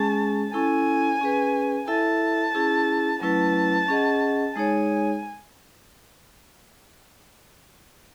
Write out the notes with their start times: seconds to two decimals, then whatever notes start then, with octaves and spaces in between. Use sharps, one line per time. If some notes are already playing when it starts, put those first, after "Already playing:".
Already playing: G#3 C#4 G#4 A5
0.53 C#4 E4 A4 G#5
1.21 C#4 G#4 B4
1.87 E4 A4 E5 A5
2.55 C#4 E4 G#4
3.21 F#3 A3 C#4 E4 B4 A5
3.88 C#4 G#4 D#5 F#5
4.55 G#3 D#4 G#4 C#5 G#5